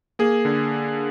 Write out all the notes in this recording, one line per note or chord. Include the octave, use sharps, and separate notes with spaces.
A#3 G#4
D3